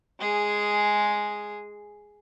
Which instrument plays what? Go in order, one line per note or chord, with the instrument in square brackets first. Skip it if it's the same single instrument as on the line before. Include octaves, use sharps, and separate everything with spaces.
[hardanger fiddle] G#3 G#4